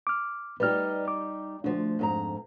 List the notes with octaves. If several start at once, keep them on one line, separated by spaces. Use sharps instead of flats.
D6 F6
G3 D#4 G4 B4 D5 F6
D6
D2 F3 D4
F2 G#2 A#5